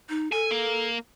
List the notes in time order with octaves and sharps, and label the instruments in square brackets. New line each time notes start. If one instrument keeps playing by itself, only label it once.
[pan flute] D#4
[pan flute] A4 [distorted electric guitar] G#5
[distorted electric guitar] A#3